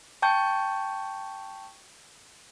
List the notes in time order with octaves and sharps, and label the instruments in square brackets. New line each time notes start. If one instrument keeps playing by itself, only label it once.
[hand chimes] G5 A5 C#6 G6